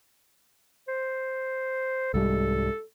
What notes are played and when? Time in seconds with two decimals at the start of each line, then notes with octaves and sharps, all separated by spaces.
0.88 C5
2.14 C2 G#2 G3 A4